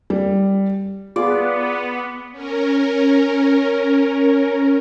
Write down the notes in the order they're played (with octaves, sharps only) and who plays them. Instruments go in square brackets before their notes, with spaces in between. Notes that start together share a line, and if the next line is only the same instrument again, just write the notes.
[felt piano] G3
[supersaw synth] B3 [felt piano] F4 G#4 [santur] D5
[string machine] C#4 A#4